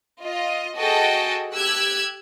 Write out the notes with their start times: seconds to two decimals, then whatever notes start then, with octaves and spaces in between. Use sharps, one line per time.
0.21 F4 D#5
0.77 F#4 G#4 A4 D#5 G5 A5
1.53 G4 E6 F#6 G#6